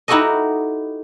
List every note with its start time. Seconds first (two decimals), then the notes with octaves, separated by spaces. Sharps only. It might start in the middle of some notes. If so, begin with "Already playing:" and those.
0.08 D#4 E4 F#4 G4 A4 D#5